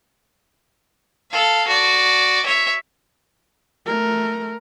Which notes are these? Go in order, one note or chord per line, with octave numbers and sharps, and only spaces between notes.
A4 F5
F#4 D5
C#5 E5
A3 A#4